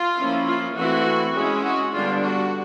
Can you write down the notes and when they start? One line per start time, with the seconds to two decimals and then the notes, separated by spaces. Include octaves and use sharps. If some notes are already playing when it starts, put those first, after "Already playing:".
Already playing: F4
0.17 F3 A#3 C#4 E4
0.46 F4
0.76 E3 A3 C4 E4 F#4
1.34 G#3 C#4 E4
1.63 F#4
1.92 D3 G3 B3 D4 F4
2.22 F#4